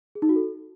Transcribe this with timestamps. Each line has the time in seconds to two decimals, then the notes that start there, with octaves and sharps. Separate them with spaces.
0.15 G#4
0.22 D#4
0.29 F#4
0.36 A4